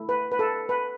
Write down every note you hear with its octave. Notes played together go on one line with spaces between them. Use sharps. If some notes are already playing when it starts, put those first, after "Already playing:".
Already playing: A3 E4
B4
B4
A4
B4